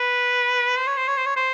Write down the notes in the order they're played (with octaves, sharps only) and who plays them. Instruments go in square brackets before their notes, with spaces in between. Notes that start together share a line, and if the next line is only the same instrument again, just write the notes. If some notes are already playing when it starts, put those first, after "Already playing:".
Already playing: [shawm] B4
C5
C#5
C5
C#5
C5
C#5
C5